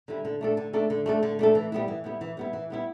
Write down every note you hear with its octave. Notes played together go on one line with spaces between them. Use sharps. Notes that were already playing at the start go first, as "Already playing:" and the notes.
D3 G3 E4
D3
A3 D4 A4
D3
A3 D4 A4
D3
A3 D4 A4
D3
A3 D4 A4
E3
G3 B3 E4
E3
G3 B3 E4
E3
G3 B3 E4
E3
G3 B3 E4